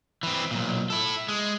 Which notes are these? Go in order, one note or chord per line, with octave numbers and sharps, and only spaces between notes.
E3 C4
B1 A#2
E4 A4
G#3